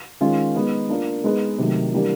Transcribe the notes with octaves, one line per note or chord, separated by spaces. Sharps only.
D#3 G#3 C#4 F4
G#3 B3 D#4
A#3 D4 F4 A#4
G#3 B3 D#4 G#4 B4
C3 D#3 F#3 A3
E3 G3 A#3 D4 G4